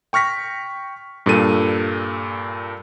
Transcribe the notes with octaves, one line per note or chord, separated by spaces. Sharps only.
G5 C#6 F6 A#6 B6
G2 A#2 A4 D#7